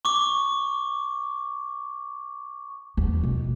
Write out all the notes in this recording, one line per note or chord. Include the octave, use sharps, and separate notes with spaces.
C#6 D6
E2
B2